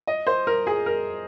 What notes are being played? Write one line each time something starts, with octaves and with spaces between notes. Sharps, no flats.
D#5
C5
A#4
G#4
A#4